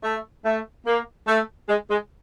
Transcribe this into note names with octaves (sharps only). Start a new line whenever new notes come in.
A3
A3
A#3
A3
G#3
G#3